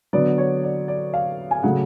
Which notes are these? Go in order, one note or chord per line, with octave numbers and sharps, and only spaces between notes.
D3 F#3 B3 D5
C#5
D5
D5
F5
G#5
C#3 F#3 A3 F#5